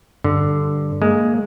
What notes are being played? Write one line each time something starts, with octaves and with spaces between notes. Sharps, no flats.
G2 D3
G#3 A#3